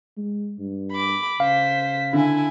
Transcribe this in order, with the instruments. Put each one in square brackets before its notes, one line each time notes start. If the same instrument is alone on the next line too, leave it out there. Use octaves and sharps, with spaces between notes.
[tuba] G#3
G2
[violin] B5 D6
[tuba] C#3 [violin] C5 B6 [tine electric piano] F5
[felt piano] D3 [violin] E4 G#5